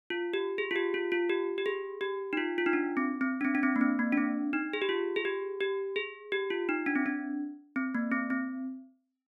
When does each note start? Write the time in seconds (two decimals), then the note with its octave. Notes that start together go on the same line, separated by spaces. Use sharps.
0.10 F4
0.34 G4
0.58 G#4
0.71 F4
0.76 G4
0.94 F4
1.12 F4
1.29 G4
1.58 G4
1.66 G#4
2.01 G4
2.33 D#4
2.37 F4
2.58 F4
2.66 D#4
2.73 D4
2.97 C4
3.21 C4
3.41 D4
3.45 C4
3.55 D4
3.63 C4
3.76 A#3
3.81 C4
3.99 A#3
4.13 D4
4.17 C4
4.53 D#4
4.73 G#4
4.82 G4
4.89 F4
5.16 G#4
5.25 G4
5.61 G4
5.96 G#4
6.32 G4
6.50 F4
6.69 D#4
6.86 D4
6.95 C4
7.06 D4
7.76 C4
7.95 A#3
8.12 C4
8.30 C4